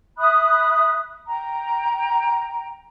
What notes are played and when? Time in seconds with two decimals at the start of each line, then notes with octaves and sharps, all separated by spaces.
0.18 E5 B5 D#6 F#6
1.28 G5 A#5